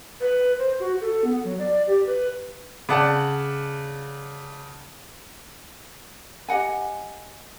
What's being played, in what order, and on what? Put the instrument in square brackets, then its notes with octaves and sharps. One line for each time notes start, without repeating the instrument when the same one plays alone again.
[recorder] B4
C5
F#4
A4
B3
F#3
D5
G4
B4
[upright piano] C#3 D5 F#5 A5
[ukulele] G4 D#5 F#5 G#5